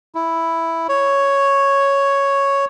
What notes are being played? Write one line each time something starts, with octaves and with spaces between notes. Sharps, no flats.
E4
C#5